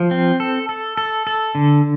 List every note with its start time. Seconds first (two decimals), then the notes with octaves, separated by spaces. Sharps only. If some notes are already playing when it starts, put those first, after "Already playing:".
Already playing: F3
0.11 C4
0.40 A4
0.69 A4
0.97 A4
1.27 A4
1.55 D3